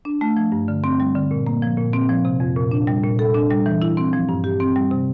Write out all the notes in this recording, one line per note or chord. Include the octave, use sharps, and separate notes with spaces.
D4
A3
F3
G2
D3
C4
G3
D3
A#2
A#3
F3
A#2
C4
F3
C3
F2
A#2
D4
G3
A#2
A4
D4
G3
E3
E4
C4
F3
G2
G4
C4
G3
C3